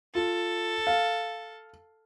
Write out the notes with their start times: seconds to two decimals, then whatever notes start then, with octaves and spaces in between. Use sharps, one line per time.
0.15 F4 A4
0.87 F5